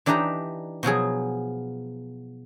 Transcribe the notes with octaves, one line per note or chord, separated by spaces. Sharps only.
E3 D4 D#4 G4 B4 A#5
B2 F3 F#3 G#4